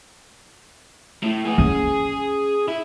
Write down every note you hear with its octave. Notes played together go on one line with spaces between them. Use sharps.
A2
B3 G#4
C#4 G#4
E4